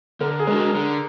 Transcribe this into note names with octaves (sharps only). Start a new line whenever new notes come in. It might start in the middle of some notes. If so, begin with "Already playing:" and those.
D3 A#4
G#4
G#3 D4 F#4 A#4
D3 A#4